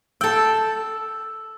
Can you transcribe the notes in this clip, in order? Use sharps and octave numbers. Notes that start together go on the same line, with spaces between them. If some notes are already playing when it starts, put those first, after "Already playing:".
A4 G5 E6